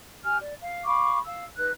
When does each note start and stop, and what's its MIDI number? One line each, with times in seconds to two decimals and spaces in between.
0.23 0.36 67
0.23 0.36 80
0.23 0.36 89
0.39 0.54 74
0.59 0.84 77
0.85 1.18 77
0.85 1.18 83
0.85 1.18 85
0.85 1.18 86
1.25 1.45 77
1.25 1.45 88
1.56 1.69 63
1.56 1.69 71
1.56 1.69 90